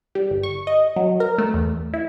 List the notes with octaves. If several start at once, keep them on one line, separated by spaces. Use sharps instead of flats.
G3
G1
C#6
D#5
F#3
A#4
A3
E2
E4